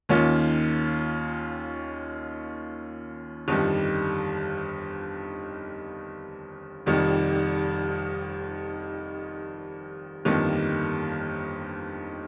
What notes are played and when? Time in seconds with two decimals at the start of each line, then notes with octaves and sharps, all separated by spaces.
0.09 D#2 D#3 A#3 C#4 F4
3.48 G1 F2 D#3 G3
6.86 F1 F2 D#3 G3
10.25 G1 F2 D#3 G3 A#3